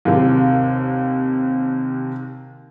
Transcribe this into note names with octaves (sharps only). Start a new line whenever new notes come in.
D#2 C3